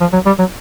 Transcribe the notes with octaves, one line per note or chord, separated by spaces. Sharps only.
F3
F#3
G3
F#3